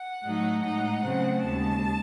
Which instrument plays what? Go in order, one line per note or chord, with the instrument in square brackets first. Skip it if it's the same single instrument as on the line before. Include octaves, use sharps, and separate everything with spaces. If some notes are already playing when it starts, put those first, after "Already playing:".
Already playing: [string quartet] F#5
A2 F#3 A3 D#4
A2 G#3 D#4 F#5
C#3 F#3 A3 C4
D#2 C#3 G#3 A5